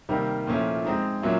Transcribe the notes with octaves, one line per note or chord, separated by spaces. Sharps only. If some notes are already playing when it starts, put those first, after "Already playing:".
C3 D#3 G3 A#3
A#2 F3 A3 C#4 E4
G#3 C4 D#4
A#2 F#3 A#3 C#4 E4